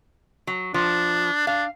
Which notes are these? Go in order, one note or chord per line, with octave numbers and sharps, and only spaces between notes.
F#3
F3 D4
D4 F5